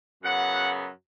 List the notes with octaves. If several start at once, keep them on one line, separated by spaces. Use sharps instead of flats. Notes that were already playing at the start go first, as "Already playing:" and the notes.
F#2 C#3 F#3 B3 F#5